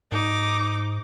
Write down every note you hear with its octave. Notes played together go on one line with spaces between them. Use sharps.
G#2 D#4 D6